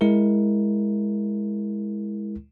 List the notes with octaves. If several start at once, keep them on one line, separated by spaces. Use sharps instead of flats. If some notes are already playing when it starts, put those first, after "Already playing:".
G#3 E4 A#4